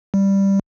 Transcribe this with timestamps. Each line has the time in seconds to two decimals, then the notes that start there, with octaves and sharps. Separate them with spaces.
0.14 G3